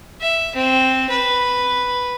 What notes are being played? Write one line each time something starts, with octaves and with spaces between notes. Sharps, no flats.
E5
C4
B4